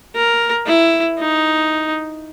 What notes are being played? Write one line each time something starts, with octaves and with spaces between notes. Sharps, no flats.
A#4
E4
D#4